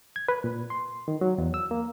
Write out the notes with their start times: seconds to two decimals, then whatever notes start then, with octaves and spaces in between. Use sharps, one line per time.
0.16 G#6
0.29 B4
0.44 A#2
0.70 C6
1.08 D#3
1.21 F#3
1.38 E2
1.54 E6
1.71 A#3